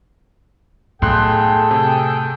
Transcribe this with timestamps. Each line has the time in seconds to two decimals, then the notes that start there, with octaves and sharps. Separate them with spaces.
1.02 B1 A2 G#4 A4 G5 C6 F#6
1.71 C3